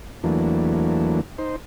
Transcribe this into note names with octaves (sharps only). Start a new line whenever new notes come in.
E2 E3 F#3 A3 A#3 D4
D#4 C5